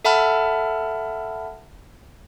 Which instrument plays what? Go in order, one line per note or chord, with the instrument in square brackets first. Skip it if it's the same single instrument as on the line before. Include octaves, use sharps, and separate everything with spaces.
[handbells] A4 E5 F#5 A5 B5 F6